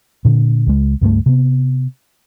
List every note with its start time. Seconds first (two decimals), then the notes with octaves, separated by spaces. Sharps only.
0.25 A#2 D3
0.67 C#2 G#3
1.01 C#2 G2 G#3 A3
1.26 C3 B3